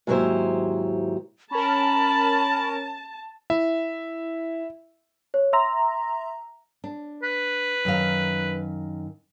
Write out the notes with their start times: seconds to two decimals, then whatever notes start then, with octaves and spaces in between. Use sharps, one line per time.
0.07 D#2 G#2 F#3 E4 G4 C5
1.51 C#4 A#4 A5 B5
3.50 E4 E5
5.34 C#5
5.53 E5 A#5 C6
6.84 D4
7.22 B4
7.85 F#2 D#3 F5